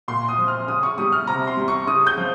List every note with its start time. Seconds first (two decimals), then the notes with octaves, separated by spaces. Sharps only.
0.08 A#2 C6
0.28 D#6
0.38 F3
0.48 F6
0.68 C#3 D#6
0.83 C#6
0.98 G3 D#6
1.12 F6
1.27 C3 A#5
1.47 C6
1.57 G3
1.68 C#6
1.87 C#3 D#6
2.07 G6
2.17 F3